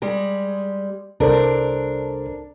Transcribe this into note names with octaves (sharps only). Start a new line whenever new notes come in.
G3 G#3
C2 D4 A4 A#4 C5